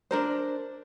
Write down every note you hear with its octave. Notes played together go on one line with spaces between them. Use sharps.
D4 A#4 C5